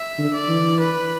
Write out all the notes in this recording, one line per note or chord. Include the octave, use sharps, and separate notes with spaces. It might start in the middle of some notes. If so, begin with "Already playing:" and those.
Already playing: E5
D3
D5
E3
B4